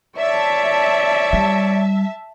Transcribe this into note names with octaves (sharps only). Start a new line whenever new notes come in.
C#5 D5 E5 A5
G3